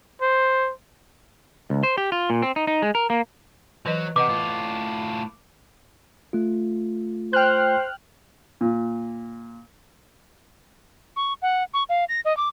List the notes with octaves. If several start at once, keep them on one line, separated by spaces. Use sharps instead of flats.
C5
C#2
C5
G4
F4
A#2
C4
D#4
D#4
G#3
A#4
A#3
E3 F#3 B4 D#5
C3 B4 D#5 F#5 D6
A2 F4
A3 F4
C5 G5 F6 F#6
A#2
C#6
F#5
C#6
F5
A#6
D#5
D6